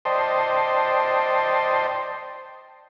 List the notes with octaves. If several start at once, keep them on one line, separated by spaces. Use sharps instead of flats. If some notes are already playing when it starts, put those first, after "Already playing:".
C5 D5 D#5 G5 A5 C6